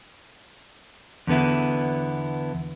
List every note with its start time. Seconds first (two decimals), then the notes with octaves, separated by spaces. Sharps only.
1.27 E2 D3 B3 E4